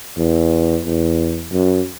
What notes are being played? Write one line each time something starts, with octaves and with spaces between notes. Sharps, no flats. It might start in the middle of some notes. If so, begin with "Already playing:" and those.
E2
E2
F#2